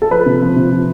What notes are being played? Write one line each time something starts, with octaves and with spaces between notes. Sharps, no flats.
A4
F3 B4
C3
F3
C3
F3